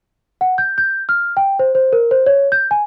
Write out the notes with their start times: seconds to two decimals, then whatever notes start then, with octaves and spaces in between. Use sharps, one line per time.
0.41 F#5
0.58 G6
0.78 G6
1.09 F6
1.37 G5
1.59 C5
1.75 C5
1.93 A#4
2.11 C5
2.26 C#5
2.52 G6
2.71 G#5